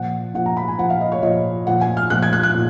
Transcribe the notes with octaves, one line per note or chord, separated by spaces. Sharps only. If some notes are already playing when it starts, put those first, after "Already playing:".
Already playing: A#2 F3 F#5
A#2 F3 F#5
A#5
B5
G#5
A#2 F3 F#5
F5
D#5
C#5
A#2 F3 D#5
A#2 F3 F#5
G#5
F6
A#2 F3 F#6
G#6
F#6
F#6
A#2